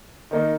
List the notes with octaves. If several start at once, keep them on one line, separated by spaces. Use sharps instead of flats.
D#3 A#3 D#4